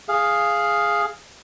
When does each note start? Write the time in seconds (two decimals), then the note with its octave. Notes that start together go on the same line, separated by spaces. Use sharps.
0.09 G#4 F5